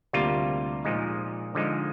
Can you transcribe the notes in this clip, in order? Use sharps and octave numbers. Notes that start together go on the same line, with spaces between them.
D2 C3 G3 A#3 F4
A#2 F3 G#3 D#4
D3 F3 G#3 D#4